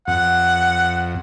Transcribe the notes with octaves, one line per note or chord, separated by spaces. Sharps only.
F2 F#5